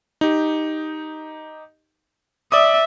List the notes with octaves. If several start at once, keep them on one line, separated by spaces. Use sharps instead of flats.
D#4 G4
D5 E5 D6 D#6